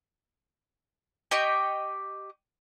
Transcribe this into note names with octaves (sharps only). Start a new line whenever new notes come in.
G4 D#5 G5 C#6